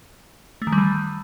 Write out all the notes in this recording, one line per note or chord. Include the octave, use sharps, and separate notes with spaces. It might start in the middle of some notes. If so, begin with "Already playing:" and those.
A3
D#3
G3
E3